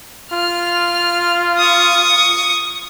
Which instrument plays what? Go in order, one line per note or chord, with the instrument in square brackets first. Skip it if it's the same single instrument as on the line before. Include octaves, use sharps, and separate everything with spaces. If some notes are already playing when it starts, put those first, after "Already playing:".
[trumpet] F4 [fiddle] F6
[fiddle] C#6 D#6